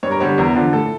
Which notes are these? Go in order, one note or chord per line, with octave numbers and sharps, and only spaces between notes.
G2 C#5
A#4
D3 G3 C#5
E2 A#4
D3 F3
A2 A4